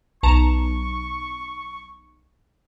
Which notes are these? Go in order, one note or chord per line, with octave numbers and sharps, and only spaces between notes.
B1 A5 A#5 C#6